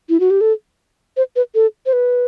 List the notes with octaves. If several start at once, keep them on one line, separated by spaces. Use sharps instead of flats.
E4
F#4
G4
A4
C5
B4
A4
C5
B4